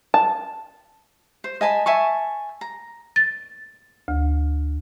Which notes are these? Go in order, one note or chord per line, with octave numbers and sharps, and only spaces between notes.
A5
C5
D#5 G#5 A5 B5
E5 G#5 A5 C#6
A#5
A6
D2